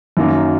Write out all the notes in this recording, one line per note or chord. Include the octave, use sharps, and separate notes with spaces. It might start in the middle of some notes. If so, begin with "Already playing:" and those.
F#2 D#3 F#3 A#3 C#4